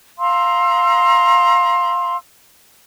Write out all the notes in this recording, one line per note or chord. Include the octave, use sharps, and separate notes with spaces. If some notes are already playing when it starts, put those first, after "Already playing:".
F5 A#5 C6 E6